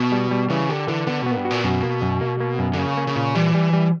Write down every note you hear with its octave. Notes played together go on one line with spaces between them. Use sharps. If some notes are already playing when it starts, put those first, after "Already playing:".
Already playing: B2
G3
G3
C#3 E3
D3 G4
D3 E3
D3 B3
B2
A#2 B3
G2
F#4
A#2
F#2 B2
A#3
F#2
A#3
A#3
F#2
D3
C#3 A#3
A#3
C#3
A#2
E3 G3
G3
G3